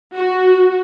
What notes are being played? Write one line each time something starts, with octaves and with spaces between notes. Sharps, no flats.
F#4